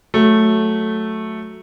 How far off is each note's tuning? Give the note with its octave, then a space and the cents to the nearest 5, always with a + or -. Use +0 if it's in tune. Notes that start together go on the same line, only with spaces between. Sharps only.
F#3 +0 A3 -5